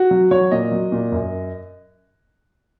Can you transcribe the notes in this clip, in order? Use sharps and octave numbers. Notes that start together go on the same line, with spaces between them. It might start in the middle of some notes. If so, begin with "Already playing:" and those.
Already playing: F#4
F#3
F#3 C#5
A#2 D#5
F#3
A#2
F#2